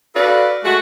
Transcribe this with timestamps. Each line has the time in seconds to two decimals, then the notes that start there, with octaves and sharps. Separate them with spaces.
0.16 F#4 A4 B4 D5 F5
0.65 G#3 A3 F#4